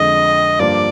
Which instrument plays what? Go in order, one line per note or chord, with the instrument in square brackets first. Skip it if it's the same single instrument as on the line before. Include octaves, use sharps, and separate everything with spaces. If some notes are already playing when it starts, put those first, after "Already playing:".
Already playing: [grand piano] F2 D3 G#3 [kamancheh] D#5
[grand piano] G2 F3 A#3 D4 [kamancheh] D5